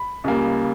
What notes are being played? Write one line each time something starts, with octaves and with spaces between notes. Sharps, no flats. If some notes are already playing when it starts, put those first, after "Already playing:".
Already playing: B5
C#2 C#3 G3 A#3